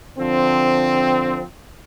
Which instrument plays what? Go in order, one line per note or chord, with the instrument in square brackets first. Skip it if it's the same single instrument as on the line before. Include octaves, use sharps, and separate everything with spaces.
[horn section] D3 F3 C4